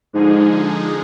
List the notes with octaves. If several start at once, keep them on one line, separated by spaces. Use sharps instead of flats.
G#2 D3 F3 G#3 D#4 G#4